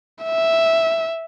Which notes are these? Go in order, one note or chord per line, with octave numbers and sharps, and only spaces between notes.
E5